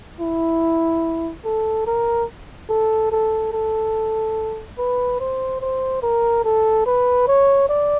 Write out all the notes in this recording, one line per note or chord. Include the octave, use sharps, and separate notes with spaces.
E4
A4
A#4
A4
A4
A4
B4
C5
C5
A#4
A4
B4
C#5
D5